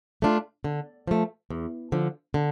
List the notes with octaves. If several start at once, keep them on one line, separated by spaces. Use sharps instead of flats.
A3 D4 F4
D3
F3 A3
E2
D3 F3
D3